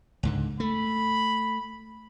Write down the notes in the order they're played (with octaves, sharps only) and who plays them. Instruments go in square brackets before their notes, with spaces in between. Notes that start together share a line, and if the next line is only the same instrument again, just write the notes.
[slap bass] C#2 G#2 D3
[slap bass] A3 [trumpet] B5